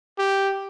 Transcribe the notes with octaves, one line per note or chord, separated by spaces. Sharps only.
G4